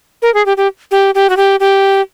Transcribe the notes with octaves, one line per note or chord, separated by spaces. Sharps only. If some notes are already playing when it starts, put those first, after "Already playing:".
A#4
G#4
G4
G4
G4
G4
F#4
G4
G4